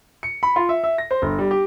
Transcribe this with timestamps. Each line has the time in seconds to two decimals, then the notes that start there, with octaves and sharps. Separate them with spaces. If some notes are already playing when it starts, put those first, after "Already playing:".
0.23 C#7
0.43 B5
0.56 F4
0.69 E5
0.84 E5
0.98 A#6
1.11 C5
1.22 G1
1.39 G3
1.51 G4